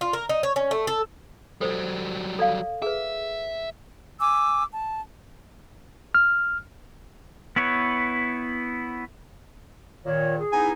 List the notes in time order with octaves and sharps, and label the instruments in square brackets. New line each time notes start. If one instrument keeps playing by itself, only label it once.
[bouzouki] F4
A#4
D#4
C#5
C#4
A3
A4
[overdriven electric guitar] F#3 G3 [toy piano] A4 C5
[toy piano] A4 D5 F5
[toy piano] G#4 B4 [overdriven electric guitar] E5
[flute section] G#5 D6 E6
A5
[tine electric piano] F6
[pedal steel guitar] B3 E4 B4 C#5
[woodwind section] A#2 D#3 [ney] C#5
[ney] G#4
[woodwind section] B3 D#4 E4 [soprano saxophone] G#5